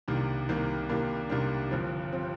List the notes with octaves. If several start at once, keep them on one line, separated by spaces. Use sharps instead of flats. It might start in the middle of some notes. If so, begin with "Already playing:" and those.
C2 C3 D#3 A#3 D4
C2 C3 D#3 A#3 D4
C2 C3 D#3 A#3 D4
C2 C3 D#3 A#3 D4
G1 G2 F3 C4
F3 C4